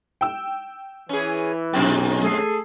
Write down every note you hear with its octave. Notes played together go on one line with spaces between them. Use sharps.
G5 E6
E3 C#4 G#4
B1 F2 G#2 C3 G5
A3 G#4 A4 C7